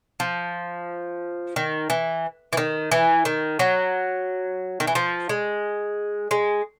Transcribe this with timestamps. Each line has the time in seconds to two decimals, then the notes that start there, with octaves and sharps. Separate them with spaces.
0.20 F3
1.56 D#3
1.90 E3
2.53 E3
2.57 D#3
2.91 E3
3.25 D#3
3.59 F#3
4.80 D#3
4.87 E3
4.95 F3
5.29 G#3
6.31 G#3